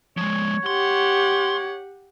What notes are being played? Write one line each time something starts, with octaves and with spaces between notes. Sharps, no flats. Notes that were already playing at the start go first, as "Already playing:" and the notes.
F3 G#3 C#5
G4 F#5 C6